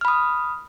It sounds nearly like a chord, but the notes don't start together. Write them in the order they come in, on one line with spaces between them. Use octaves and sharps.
F6 B5 D#6